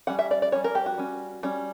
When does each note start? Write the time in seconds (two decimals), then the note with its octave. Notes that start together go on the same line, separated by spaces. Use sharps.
0.07 G3 C#4 F#5
0.19 E5
0.31 D5
0.42 D5
0.52 G3 C#4 C#5
0.64 A#4
0.75 G4
0.86 F#4
0.98 G3 C#4
1.43 G3 C#4